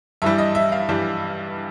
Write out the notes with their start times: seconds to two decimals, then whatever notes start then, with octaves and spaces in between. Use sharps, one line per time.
0.22 G2 E3 G3 E5
0.38 D#5
0.55 E5
0.72 F5
0.89 G2 E3 G3